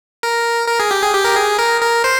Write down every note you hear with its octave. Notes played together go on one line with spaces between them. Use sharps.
A#4
A#4
G#4
G4
G#4
G4
A#4
G#4
A#4
A#4
C5